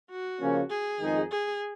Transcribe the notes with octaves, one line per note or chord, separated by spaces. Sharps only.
F#4
C#3 F3 A#3 C#4
G#4
F2 D#3 G#3 D#4
G#4